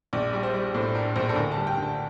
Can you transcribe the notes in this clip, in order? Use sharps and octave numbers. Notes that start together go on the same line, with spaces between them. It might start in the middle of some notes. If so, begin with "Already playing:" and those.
A#1 D5
G3
C5
G3
A2 C5
D4 A#4
A#1 C5
A4
D2 A#4
G3 A5
G5
D2
A5